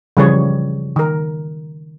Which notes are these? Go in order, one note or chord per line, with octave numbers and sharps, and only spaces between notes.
C#3 E3 F3 G3 G#4 C#5
D#3 A#4